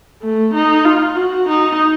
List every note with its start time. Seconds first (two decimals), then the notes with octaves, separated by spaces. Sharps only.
0.21 A3
0.54 D#4
0.85 F4
1.16 F#4
1.49 D#4